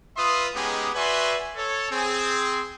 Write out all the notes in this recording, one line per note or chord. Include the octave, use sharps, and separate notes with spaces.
F4 B4 E5 C6 D#6
G#3 B3 C#4 D#4 G4 G#4
F#4 B4 D5 E5 G#5 C6
A4 C#5
C4 G#4